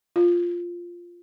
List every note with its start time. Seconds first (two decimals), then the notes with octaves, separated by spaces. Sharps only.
0.16 F4